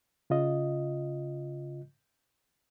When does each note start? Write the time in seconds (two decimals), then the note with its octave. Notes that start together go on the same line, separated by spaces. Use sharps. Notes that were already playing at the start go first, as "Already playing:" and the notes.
0.30 C#3 F4 D#5